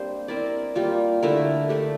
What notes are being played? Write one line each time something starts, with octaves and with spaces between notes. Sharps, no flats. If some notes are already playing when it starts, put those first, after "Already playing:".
Already playing: G3 A#3 C4 D4 G4 C5
C4 E4 A#4 D5
G3 A#3 F4
D3 A3 E4 A#4
A3 D4 G4